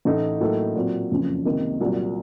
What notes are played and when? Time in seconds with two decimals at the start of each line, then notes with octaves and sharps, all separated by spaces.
0.05 A1 A2 A3 D#4 A4
0.41 A2 F#3 A#3 D#4 A4
0.75 A#2 F#3 C4
1.10 F#1 F2 C#3
1.45 C#2 C3 D#3 A#3 D#4
1.81 C2 A#2 F#3